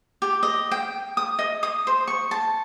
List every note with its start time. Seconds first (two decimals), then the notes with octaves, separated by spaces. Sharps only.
0.22 G4
0.43 D#5
0.71 G5
1.17 D#6
1.39 D#5
1.63 D#6
1.87 C5
2.08 C#6
2.31 A5